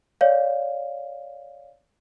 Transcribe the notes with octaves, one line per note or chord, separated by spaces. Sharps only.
C#5 D5 F5